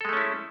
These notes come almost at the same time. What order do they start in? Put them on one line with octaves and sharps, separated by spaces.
A4 G#3 A3 C#4 E4